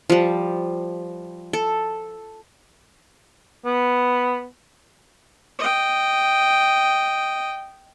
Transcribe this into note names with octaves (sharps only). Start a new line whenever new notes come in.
F3 G3
A4
B3
D#5 G5